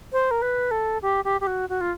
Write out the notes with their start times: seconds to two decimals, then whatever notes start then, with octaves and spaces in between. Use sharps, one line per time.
0.12 C5
0.31 A#4
0.42 B4
0.71 A4
1.02 G4
1.24 G4
1.41 G4
1.47 F#4
1.69 F#4
1.81 F4